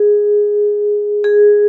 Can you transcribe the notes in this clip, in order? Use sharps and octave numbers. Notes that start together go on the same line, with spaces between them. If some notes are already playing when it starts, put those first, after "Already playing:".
Already playing: G#4
G#4